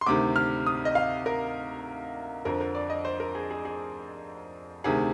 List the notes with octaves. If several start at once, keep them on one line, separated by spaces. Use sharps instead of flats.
C6
D2 C3 D#3 D6
F6
D#6
D#5
F5
A#4
F2 D3 F3 A#4
A#4
D5
D#5
C5
A#4
G#4
G#4
G#4
D2 C3 D#3 G#4